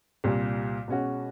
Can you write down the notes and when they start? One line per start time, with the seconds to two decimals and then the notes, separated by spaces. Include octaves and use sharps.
0.24 C2 A#2 G3
0.88 B2 G#3 C#4 F#4